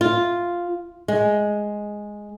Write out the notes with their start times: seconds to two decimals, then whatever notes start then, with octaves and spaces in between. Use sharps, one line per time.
0.01 F4
1.08 G#3